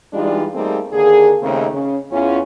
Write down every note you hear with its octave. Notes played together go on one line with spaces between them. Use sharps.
E3 G3 G#3 D4 D#4 F4
G3 A3 A#3 C4 D#4 G#4
D#2 D3 A#3 G#4
D#2 C#3 A3 C4 D#4
C#3
E2 C#4 F4